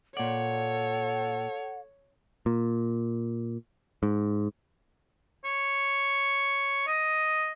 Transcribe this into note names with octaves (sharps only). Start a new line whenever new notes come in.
A#2 A4 C#5 D5 F#5
A#2
G#2
C#5
D#5